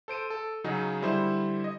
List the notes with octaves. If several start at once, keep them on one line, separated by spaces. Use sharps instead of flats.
A4 C5 D7 D#7
A4
C#3 F#3 C#4 D#4 G#4
D3 G3 E4 C5
D#5